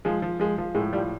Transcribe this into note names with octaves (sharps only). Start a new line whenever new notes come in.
F3 G#3
F3
F3 G#3
F3
A2 G#3
F3 G3